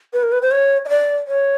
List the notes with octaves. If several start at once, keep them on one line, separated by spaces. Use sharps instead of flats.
B4
A#4
B4
C5
C#5
D#5
D5
C#5